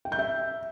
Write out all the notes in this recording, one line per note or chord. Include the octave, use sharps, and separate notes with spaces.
G5
G6
E5